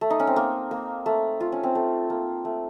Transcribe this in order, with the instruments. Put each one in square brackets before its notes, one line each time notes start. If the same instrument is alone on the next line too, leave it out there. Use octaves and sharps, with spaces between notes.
[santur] A3
D#4
C#4
C4
A#3
A#3
A3
F4
C#4
C4
A3
A#3
A3